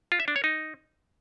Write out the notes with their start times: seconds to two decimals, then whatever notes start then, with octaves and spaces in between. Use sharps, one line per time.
0.12 F4
0.20 E5
0.28 D4
0.36 C#5
0.44 D#4